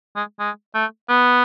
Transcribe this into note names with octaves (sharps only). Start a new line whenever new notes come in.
G#3
G#3
A3
B3